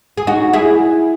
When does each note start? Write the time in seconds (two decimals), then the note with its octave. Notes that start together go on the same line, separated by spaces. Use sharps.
0.17 G#4
0.27 D#4 F#4
0.53 E4 G#4